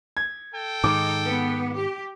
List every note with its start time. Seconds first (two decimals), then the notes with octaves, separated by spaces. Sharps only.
0.17 G#6
0.53 A4 G5
0.84 G#2 D#3 D#4 D6
1.25 B3
1.76 G4